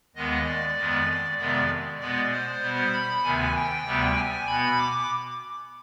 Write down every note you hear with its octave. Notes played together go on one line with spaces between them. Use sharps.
D#2 D#3 G#3 B3 D#5
D5
F2 D#3 G#3 B3
F2 C3 D#3 G#3 B3 D5
B2 G#3 B3 D5
C5
B2 G3 B3
B5
D2 C3 D#3 B3 G#5
G5
D2 C3 G3 B3
G#5
B2 B3 B5
D6